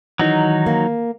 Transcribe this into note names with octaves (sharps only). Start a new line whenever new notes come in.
D#3 E3 F#3 D#4
A#3